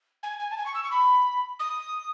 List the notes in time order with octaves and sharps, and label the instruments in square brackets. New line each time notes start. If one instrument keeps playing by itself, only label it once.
[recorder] G#5
G#5
A5
G#5
C#6
E6
C#6
B5
D#6